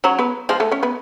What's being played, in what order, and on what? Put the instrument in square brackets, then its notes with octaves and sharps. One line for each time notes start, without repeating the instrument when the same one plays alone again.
[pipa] F#3 [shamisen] C#4 C#5
[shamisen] B3 B4
[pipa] F3 [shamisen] G#3 G#4
[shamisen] A3 A4
C#4 C#5
B3 B4